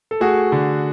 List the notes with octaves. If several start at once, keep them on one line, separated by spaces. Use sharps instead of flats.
A4
A3 F#4 G#4
D3